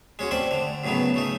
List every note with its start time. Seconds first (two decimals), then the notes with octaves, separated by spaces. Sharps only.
0.19 G#3 C#4 F#4
0.31 A3 C4 C5 D5
0.51 D3
0.84 F#2 A2 C#3 F#3 B3
1.14 C#3 A3 D#4